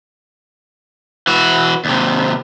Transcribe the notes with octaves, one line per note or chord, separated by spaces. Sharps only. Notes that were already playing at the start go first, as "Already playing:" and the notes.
E3 F#4
D#2 C3